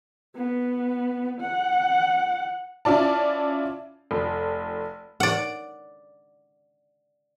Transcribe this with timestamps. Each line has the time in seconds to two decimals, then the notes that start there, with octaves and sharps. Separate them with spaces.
0.36 B3
1.41 F#5
2.85 C#4 E4 F4 D5 A5
4.11 F1
5.20 D5 F#5